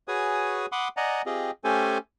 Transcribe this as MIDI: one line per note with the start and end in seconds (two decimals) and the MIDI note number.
0.08 0.66 66
0.08 0.66 68
0.08 0.66 71
0.08 0.66 73
0.08 0.66 80
0.08 0.66 87
0.72 0.88 78
0.72 0.88 83
0.72 0.88 84
0.72 0.88 86
0.72 0.88 87
0.97 1.22 74
0.97 1.22 75
0.97 1.22 78
0.97 1.22 80
0.97 1.22 82
1.26 1.51 60
1.26 1.51 65
1.26 1.51 67
1.26 1.51 68
1.26 1.51 75
1.64 1.98 57
1.64 1.98 61
1.64 1.98 67
1.64 1.98 69
1.64 1.98 72
1.64 1.98 80